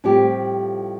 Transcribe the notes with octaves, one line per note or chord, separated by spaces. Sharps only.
A2 F3 G3 A3 C4 G4